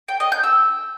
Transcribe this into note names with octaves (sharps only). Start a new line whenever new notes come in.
G5
D#5
G6
E6